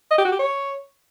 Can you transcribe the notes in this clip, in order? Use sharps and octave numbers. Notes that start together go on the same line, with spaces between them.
D#5
G4
F#4
G4
C#5